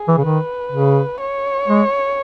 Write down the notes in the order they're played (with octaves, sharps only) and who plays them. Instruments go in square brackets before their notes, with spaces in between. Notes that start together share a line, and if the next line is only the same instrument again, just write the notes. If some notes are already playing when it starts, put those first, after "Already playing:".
Already playing: [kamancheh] G#4
[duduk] E3
C#3
[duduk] D#3 [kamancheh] B4
[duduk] C#3
[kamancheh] C#5
[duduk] G#3